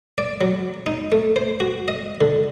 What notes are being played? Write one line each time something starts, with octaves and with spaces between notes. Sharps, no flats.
D5
F#3
D#4
A3
C5
F#4
D#5
D3